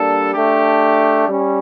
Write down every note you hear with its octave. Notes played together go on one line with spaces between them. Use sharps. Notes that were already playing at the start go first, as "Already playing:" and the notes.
Already playing: G3 A#3 D4 A4
A3 D4 G4
G3 C#4